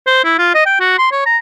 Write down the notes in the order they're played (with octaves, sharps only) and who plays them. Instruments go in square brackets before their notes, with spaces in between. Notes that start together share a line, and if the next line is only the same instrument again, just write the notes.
[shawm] C5
E4
F4
D#5
G5
F#4
C6
C#5
A#5